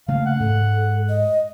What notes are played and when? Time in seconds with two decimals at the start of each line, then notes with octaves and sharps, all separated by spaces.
0.08 C#3 A3 A#3 F5
0.26 F#5
0.40 G#2 A4
1.09 D#5